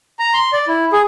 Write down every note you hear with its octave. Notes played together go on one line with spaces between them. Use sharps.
A#5
C6
D5
E4
G#4